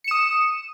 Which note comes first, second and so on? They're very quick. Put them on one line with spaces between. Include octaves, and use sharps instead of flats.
C#7 E7 D#6